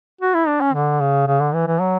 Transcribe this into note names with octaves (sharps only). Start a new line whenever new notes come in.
F#4
E4
D4
C#4
D3
C#3
C#3
D3
E3
E3
F#3